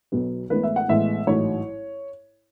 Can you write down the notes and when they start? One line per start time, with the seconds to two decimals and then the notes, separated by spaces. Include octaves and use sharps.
0.12 B1 B2 F#3 B3
0.50 A1 A2 G#3 B3 B4
0.63 E5
0.76 F#5
0.88 A1 A2 G#3 B3 E5
1.27 A1 G#2 F#3 A3 C#5